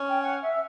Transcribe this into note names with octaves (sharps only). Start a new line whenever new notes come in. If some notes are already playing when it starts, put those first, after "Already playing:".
Already playing: C#4
G5
F#5
E5